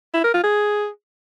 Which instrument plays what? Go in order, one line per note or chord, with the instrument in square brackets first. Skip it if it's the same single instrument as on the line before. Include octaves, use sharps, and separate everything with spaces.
[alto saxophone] E4
A#4
F4
G#4